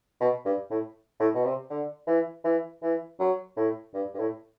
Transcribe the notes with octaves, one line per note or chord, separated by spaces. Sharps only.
B2
G2
A2
A2
B2
C3
D3
E3
E3
E3
F#3
A2
G2
G2
A2